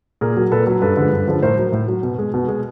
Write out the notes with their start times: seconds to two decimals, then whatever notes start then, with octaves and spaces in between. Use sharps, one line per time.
0.21 A#2 G#4 A#4
0.37 F#3
0.52 A#2 A4 B4
0.67 F#3
0.81 G2 A4 B4
0.97 D3 F3 G#3
1.12 G2
1.28 D3 F3 G#3
1.43 A2 A#4 C5
1.58 F#3
1.72 A2
1.88 F#3
2.03 B2
2.18 G#3
2.34 B2
2.48 G#3